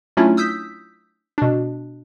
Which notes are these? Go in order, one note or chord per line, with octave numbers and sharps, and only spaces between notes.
F#3 A3 C#4 D4 E4 F4
D#6 E6 G6 B6
B2 D4